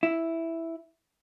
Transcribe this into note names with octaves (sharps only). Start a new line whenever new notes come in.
E4